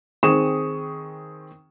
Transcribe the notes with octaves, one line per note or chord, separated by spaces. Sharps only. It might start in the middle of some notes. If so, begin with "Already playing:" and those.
D#3 C4 G#4 C#6 D#6 E7